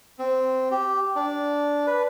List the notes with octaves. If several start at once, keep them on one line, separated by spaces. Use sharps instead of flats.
C4
G4
D4
B4